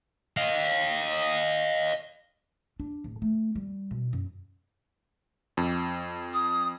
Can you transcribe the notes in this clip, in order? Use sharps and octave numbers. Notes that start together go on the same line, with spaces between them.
D#5 F5
D4
D1
A3
G3
B2
F#2
F2
D#6